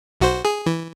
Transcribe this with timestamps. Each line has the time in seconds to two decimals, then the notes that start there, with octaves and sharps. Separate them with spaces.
0.21 B1 F#4 C5
0.45 G#4
0.66 E3